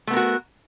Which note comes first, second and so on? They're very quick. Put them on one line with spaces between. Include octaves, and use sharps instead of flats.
A3 B3 A#4 F#4